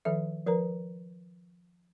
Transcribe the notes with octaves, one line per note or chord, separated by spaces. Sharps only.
D#3 F3 A4 E5
F3 A#4 B4 A#5